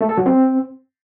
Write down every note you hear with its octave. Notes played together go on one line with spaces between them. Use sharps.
A3
A4
F#3
C4